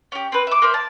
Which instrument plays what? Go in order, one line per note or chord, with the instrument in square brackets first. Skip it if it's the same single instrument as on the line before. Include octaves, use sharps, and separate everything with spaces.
[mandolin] C#4 G4
C4 B4
E5 D6
A#3 C5 E5
A5